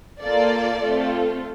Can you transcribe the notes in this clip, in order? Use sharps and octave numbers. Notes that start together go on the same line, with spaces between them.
A#3 F4 A4 D5
A3 C4 F4 A4